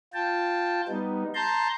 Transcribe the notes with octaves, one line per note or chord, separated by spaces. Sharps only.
F4 G5 A5
G3 B3 D#4
A5 A#5 C6 G6